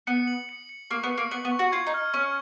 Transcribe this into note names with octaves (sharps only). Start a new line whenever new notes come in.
B3 C#7
F#7
C#7
C#7
A#3 C#6
B3
C#7
A#3
B3 F#7
B3
C#6
F#4
F4 G#6
D#4
F6
C#4 C#6